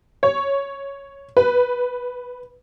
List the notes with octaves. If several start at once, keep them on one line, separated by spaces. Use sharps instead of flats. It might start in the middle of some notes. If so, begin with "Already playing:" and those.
C#5
B4